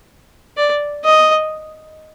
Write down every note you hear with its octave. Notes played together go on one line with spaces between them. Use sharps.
D5
D#5